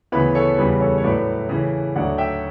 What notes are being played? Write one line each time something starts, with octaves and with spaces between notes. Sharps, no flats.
D2 C#3 E3 B3 B4
A4 C#5
E2 C#3 G3 B4
A4 C#5
C#5
A2 F#3 A3 B4 D5
C#3 E3 A3
D2 D3 F#3 A3 D4 D5 F#5
E5 G5